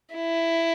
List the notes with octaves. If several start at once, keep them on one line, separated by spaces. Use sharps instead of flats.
E4